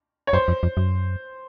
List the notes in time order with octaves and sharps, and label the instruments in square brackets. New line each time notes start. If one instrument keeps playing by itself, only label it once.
[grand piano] C#5
[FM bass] F#2 [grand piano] C5
[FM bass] F2
F2
F#2